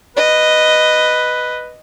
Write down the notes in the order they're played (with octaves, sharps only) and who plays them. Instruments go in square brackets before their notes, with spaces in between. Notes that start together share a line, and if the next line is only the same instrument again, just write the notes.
[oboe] B4 [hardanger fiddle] D#5